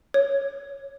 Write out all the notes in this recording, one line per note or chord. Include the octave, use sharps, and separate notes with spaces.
C#5